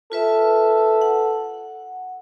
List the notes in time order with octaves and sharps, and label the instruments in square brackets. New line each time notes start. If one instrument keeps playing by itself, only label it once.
[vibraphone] F4 B4 E5 [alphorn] A4
[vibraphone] F#5